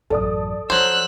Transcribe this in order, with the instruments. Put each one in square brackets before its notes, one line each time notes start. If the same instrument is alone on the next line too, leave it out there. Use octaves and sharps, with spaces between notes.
[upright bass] A1 F#2 [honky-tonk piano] A4 D5 D#6
[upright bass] F3 [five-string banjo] F#3 C5 [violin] E6 F#6